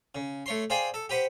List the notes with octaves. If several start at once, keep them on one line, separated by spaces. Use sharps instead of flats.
C#3
A3 C#5 C6
G#4 C5 D5 F5 G5 G#5
A4
G4 B4 C5 F#5